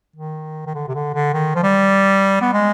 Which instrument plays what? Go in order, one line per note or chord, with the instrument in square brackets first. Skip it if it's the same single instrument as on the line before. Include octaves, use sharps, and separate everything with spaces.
[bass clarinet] D#3
D#3
D3
C3
D3
D3
D#3
F3
G3
B3
G#3